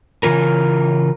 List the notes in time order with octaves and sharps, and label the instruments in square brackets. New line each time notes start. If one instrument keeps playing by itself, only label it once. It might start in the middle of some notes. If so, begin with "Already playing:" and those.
[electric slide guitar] C#3 E3 F4 A#4